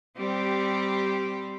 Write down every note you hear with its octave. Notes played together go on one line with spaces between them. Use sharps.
G3 C4 G4